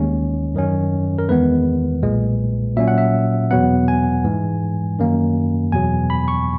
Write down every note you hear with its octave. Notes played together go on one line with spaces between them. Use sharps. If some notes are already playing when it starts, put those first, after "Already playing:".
Already playing: D#2 D#3 G#3 C#4
F#2 D#3 F#3 C#4
A#4
E2 D#3 G#3 B3 B4
B1 A#2 G#3
A#2 F#3 C#4 E5
F#5
E5
E2 B2 F#3 B3 F#5
G#5
G#2 E3 G#3
F#2 D#3 A#3
E2 B2 F#3 G#5
B5
C#6